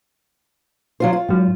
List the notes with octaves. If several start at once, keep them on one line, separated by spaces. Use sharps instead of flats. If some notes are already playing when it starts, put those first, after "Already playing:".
F#3 F4 C5
F4
G#2 F#3